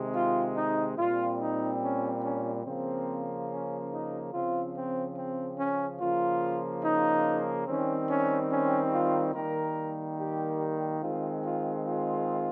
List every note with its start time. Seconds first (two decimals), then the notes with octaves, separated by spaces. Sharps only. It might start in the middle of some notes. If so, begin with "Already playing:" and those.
Already playing: C3 D#3 G#3
0.14 F4
0.55 D#4
0.97 A#2 G3 C4 F4
1.40 D#4
1.82 C#4
2.22 C#4
2.64 C#3 F3 A#3 C4
3.49 C#4
3.91 D#4
4.32 C#3 F3 C4 F4
4.74 C4
5.16 C4
5.57 C#4
5.99 C#3 F3 A#3 F4
6.83 D#4
7.66 D#3 G3 C4 C#4
8.08 C#4
8.50 C#4
8.91 F4
9.34 D#3 G3 A#3 A#4
10.17 G4
11.01 D#3 G#3 C4 F4
11.43 F4
11.85 F4